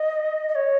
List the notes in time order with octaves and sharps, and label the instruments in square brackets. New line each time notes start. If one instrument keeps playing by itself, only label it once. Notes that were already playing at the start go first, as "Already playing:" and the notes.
Already playing: [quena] D#5
D#5
C#5